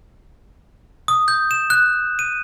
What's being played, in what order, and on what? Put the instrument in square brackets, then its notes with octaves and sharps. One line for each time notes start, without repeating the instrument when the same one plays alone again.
[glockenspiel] D#6
G6
E7
F#6
D#7